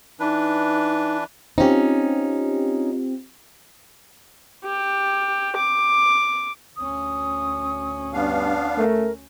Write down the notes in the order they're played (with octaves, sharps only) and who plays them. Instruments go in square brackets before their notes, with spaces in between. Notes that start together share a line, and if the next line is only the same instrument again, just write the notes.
[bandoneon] E3 D4 B4 [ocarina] D#4
[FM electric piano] C4 F4 G4 [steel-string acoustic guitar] C#4 D#4
[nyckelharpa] G4
D6
[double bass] D2 C#4 [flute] D#6
[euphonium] G2 [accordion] B3 D4 F5
[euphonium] A3 [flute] A#4